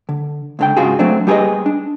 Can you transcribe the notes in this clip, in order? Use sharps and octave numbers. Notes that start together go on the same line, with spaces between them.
D3
C#2 D3 G5
G#2 C#3 F4 F#4 G#4
F#3 A3 C4 D4
G3 G4 G#4 A#4 B4 D#5
D4